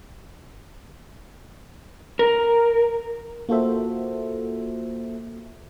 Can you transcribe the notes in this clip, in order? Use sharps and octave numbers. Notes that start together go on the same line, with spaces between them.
A#4
A#3 F4 F#4 A4 C5 E5